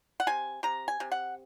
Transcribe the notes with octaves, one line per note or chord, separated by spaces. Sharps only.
F#5
C3 G#5
C3 A#5
G#5
C3
F#5